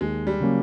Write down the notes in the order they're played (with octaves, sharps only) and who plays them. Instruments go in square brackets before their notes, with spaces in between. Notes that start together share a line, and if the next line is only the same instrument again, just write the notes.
[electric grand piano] D#2 [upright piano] G#3
[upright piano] G3
[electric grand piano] C#3 F#3 A#3 C#4